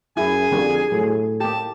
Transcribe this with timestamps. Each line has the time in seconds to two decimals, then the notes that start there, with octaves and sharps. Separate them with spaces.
0.17 F#2 E4 G#4 G#5
0.51 F2 D3 G3 A#3
0.92 A2 F#3
1.40 A#3 G4 A5